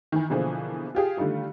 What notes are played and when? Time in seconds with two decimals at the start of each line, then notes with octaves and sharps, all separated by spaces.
0.12 D#3 E3
0.30 B2 D3 E3 F3 A#3 G#4
0.95 F4 G4 G#4
1.17 D3 D#3 G3 A3 F4